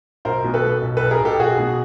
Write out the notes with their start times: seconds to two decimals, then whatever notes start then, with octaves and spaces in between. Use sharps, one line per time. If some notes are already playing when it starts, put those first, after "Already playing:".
0.25 B1 A#4 C5
0.44 B2
0.54 A4 B4
0.64 B2
0.82 B1
0.97 B1 A4 B4
1.11 G#4 A#4
1.20 B1 G4 A4
1.39 B1 F#4 G#4
1.58 B2